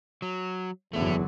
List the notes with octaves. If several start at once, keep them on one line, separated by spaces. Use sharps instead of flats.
F#3
F#1 E2 D3 F#3 A3 E4